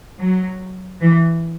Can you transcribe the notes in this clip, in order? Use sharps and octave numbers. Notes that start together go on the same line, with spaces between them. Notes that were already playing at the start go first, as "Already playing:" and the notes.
F#3
E3